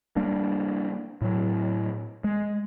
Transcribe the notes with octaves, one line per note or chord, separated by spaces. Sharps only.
G3 A#3 D4
A2 F#3
G#3